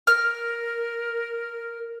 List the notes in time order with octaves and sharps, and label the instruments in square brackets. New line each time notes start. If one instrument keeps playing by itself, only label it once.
[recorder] A#4 [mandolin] F6